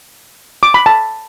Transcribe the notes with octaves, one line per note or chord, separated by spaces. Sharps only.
D6
B5
A5